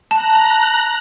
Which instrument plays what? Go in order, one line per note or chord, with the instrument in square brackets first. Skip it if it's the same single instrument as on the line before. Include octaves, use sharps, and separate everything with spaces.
[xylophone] A5 [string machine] A#5 F#6